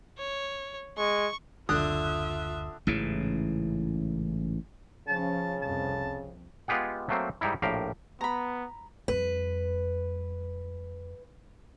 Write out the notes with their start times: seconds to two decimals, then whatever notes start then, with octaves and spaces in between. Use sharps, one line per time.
0.18 C#5
0.98 G#3 C#6
1.69 F#1 D2 D3 F4 E5 D#6 F#6
2.87 A1 G#2 C#3 E3
5.08 C#3 F3 C#4 A5
5.62 C2 F2 A5
6.68 G#3 B3 F4 G4 G#4 F#5
7.09 F#3 A3 A#3 C4
7.41 G#2 G3 D#4 E4
7.62 A#1 A2 G4 A#4 F5
8.21 B3 A#5 B5
9.08 F2 G3 B4